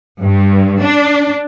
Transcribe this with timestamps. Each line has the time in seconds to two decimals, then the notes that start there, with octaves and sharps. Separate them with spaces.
0.21 G2
0.82 D4